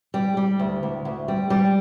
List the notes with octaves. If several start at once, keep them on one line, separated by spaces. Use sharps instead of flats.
G3
G3
D2
D2
D2
G3
G3